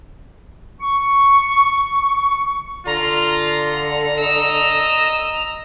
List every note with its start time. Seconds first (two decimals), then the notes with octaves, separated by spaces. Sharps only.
0.80 C#6
2.14 C#6
2.87 D3 F4 A#5
4.19 D#5 E6